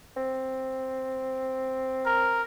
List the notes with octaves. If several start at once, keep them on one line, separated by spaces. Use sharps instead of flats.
C4
A#4